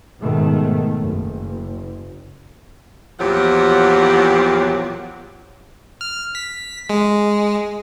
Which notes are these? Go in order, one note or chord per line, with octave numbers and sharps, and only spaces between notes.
G#2 B2 D#3 A3
F#1
E2 A#2 F3 F#3 G4 F#5
F6
B6
G#3